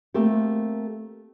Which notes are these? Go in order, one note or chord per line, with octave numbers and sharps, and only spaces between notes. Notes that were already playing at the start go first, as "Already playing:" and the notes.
A3 A#3 C4 G4